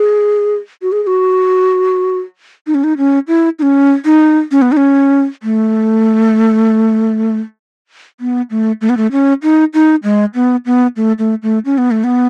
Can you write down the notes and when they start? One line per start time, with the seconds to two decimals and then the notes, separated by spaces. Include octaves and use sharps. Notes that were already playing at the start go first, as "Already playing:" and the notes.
Already playing: G#4
0.82 F#4
0.92 G#4
1.03 G#4
1.07 F#4
2.67 D#4
2.75 C#4
2.84 D#4
2.98 C#4
3.28 E4
3.59 D#4
3.62 C#4
4.05 D#4
4.51 C#4
4.62 B3
4.72 D#4
4.77 C#4
5.43 A3
8.20 B3
8.51 A3
8.81 A3
8.89 B3
8.97 A3
9.12 C#4
9.43 D#4
9.74 D#4
10.03 G#3
10.35 B3
10.66 B3
10.96 A3
11.19 A3
11.43 A3
11.65 C#4
11.78 B3
11.91 A3
12.04 B3